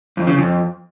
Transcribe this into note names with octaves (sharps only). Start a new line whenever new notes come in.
F2
C#3
F2